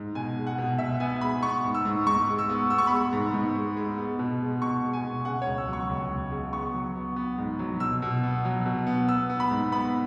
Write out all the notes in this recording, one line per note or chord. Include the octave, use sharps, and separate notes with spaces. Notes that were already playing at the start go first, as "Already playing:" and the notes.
Already playing: G#2
B2 G#5
G#3
F#5
B2
B2 E5
B3 G#5
G#3 B5
B3 C#6
G#2
E6
G#2
G#2 C#6
G#3
E6
B3
B3 E6
C#6
B5
G#3 C#6
G#2
G#2
G#3
G#3
B3
B2
G#3
B2 C#6
G#3
G#5
B2
C#3 F#5
C#2 C#5
E6
F#3 C#6
C#2
C#2
C#3
B3 C#6
F#3
B3
B3
G#2
F#3
B2 E6
B2
B3
F#3
B2
B3
B3 E6
B3
B5
G#2
B3 B5